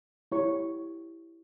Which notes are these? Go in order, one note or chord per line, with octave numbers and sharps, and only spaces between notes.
E4 G4 C#5 C#6